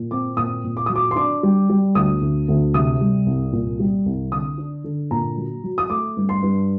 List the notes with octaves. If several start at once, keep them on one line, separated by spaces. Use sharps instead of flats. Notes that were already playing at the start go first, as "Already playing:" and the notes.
Already playing: A#2
C4 D6
A#2 D#6
A#2
D6
F#3 D#6
D6
C6
D4 D6
G3
G3
D2 D#6
D2
D2
C3 D#6
G3
C2
A#2
G3
C2
D3 D#6
D4
D3
A#2 A#5
F#3
F#3
D#6
A3 D6
G2
C6
G2